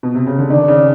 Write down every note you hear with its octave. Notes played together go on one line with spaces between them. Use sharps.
B2
C3
C#3
D3
D#3 D4
C#3